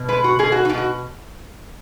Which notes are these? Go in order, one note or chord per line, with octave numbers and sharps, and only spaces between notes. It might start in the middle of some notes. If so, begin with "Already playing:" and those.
Already playing: B2
G#3 B4
F#4
B2 G#4
F#4
B2 D#4
F#4